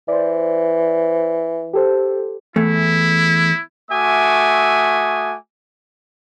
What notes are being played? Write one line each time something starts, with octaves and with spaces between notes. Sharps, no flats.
E3 C5 D5
G4 A4 C5
E2 A3 E4
A3 F#4 E5 G#5 D6 D#6